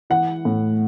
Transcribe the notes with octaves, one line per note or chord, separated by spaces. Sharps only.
E3 F#5
A2